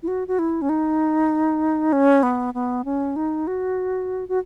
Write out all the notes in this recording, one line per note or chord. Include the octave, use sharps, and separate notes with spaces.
E4
F#4
F#4
E4
C#4
D#4
C#4
B3
B3
C#4
D#4
F#4
F#4